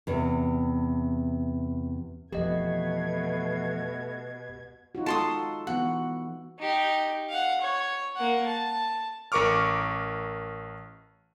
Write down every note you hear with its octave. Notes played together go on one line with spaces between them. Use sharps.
E2 C3
F2 B2 E3 A3 G4 D#5 G#6
D#4 F4 F#4
G#3 F#4 A4 A5 C6 D#6
E3 B3 F#4 F#5
D#4 G4
F5 F#5
C#5
A#3 F#5
A5
A1 A#4 C#6 D6 F6